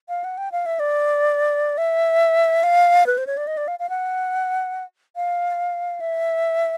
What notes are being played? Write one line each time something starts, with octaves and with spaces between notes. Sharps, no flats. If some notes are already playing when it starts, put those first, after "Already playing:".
F5
F#5
G5
F5
E5
D5
E5
F5
B4
C5
C#5
D5
D#5
D5
F5
F5
F#5
F5
E5